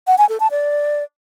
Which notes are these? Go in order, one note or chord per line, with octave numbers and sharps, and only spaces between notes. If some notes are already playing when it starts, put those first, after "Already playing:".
F#5
G#5
A4
A5
D5